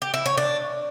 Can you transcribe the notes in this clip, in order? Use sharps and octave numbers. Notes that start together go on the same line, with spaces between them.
G4
E4
C#5
D4